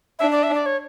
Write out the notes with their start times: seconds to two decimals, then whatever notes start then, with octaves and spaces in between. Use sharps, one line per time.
0.19 D4 E5
0.32 D5
0.43 E5
0.55 D5
0.66 C#5